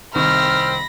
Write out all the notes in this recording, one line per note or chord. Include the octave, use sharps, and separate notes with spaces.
C2 D#3 C4 B5 C#6 F6 A#6